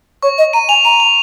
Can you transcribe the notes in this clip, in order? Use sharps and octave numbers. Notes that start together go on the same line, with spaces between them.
C#5 C#6
D#5
A#5 D#7
G#5 F7
A#5 D#7
F7